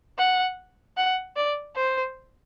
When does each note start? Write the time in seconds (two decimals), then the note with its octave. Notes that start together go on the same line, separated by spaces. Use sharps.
0.18 F#5
0.97 F#5
1.36 D5
1.76 C5